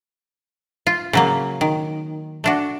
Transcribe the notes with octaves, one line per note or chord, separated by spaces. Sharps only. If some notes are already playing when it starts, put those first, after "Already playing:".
F4
C#3 F#3 A#3
D#3
A3 D4 F#4